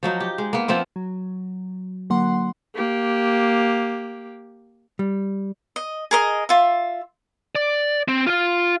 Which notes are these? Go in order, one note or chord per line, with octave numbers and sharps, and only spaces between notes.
F3 F#3 D#4
G4
G#3
A#3 B3
F3 B3 C4 E4
F#3
D3 F#3 A#3 F#5 C6
A#3 G4
G3
D#5
G#4 A#4 D#5
F4 E5
D5
C4
F4 F5